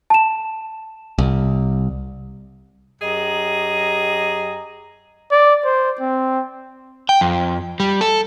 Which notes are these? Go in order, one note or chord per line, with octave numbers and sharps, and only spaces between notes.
A5 E7
C2
F#2 G4 G#4 D#5 A#5
D5
C5
C4
G5
F2
G3
A4